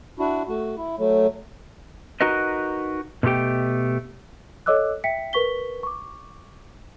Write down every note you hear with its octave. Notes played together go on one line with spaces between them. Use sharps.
D4 E4 F#4
A3 F#4
E4
F#3 A3
D#4 F#4 A#4 B4 D#5
B2 D3 A3 G4 G5
A4 C#5 D#5 D6 E6 F#6
E5 G5 B6 C#7
A#4 B4 C#6 B6 G7
C#6 D6